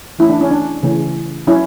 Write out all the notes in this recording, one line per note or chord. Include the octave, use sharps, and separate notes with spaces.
E3 A3 C#4 E4
D4
C#4
D4
C#3 E3 A3 C#4
F#3 C#4 E4